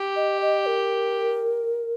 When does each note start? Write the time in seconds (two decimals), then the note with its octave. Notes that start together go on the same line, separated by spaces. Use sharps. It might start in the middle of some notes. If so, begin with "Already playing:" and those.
Already playing: G4
0.16 D#5
0.42 D#5
0.66 A#4